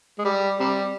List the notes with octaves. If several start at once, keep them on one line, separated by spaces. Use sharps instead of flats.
G#3
G3
C3 G3